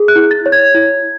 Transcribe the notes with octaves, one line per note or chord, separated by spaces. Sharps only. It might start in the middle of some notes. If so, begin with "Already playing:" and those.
Already playing: G#4
F#6
E4
A6
C#5
G#6
E4